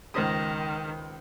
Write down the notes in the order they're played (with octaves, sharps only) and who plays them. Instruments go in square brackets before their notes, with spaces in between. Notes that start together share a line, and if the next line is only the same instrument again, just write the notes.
[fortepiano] C#2 C5 D#6 [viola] D#3